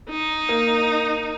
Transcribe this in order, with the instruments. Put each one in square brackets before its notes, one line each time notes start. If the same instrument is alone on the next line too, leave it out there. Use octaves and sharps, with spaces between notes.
[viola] D#4
[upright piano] A#3